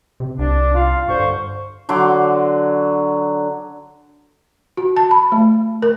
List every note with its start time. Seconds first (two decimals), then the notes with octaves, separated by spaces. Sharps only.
0.20 C3
0.39 C2 D4
0.75 F4 F5
1.08 G2 D3 C5 C#6
1.89 D3 F#3 C6 D6
4.77 F#4
4.96 A5
5.11 B5
5.32 A3
5.82 A#4